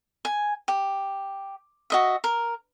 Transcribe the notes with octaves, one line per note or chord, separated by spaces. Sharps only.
G#5
G4
F#4 D#5 E5
A#4